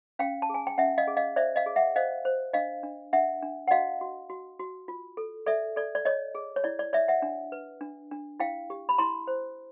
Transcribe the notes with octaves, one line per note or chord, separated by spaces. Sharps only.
C#4 F5 G5
A5
G#4 G#5
G5
C#4 E5 F#5
D#5 F5
G#4
D#5 F5
C5 D5 E5
D#5 F5
G#4
E5 F#5
C5 D#5 F5
C5
D4 D#5 F5
D4
D4 E5 F#5
D4
F#5
F#4 D#5 F5
F#4
F#4
F#4
F4
A4
A4 D5 E5
A4 D5
D5
C#5 D#5
G#4
C#5
E4 D5
D5
C#5 D5 E5
E5 F#5
D4
B4
D4
D4
E4 F5 G5
G4
B5
E4 A#5 C6
C5